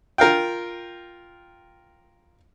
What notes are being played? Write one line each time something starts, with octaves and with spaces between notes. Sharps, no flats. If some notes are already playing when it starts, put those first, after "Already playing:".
F4 A#4 F5 G5